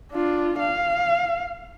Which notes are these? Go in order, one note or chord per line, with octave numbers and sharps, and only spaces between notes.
D4 F4
F5